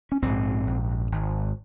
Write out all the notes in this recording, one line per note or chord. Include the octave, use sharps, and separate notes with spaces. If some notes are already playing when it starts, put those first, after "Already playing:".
C#4
A#1 G#2 C4
A#1 G#2
G#1 G#2